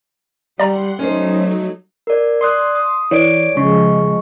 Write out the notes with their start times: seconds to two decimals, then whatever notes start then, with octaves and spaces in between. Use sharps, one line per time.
0.60 G3 D5 F#5 A#5 C6
0.99 F#3 A3 C#4 D#4 C5
2.07 A#4 D5
2.41 D5 C6 D#6 F#6
2.75 D#6
3.11 E3 C#5 D5 D7
3.57 C#3 F3 G#3 C#6